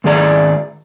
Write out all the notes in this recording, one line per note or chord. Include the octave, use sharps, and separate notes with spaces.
G#2 D#3 G#4 D5 A#5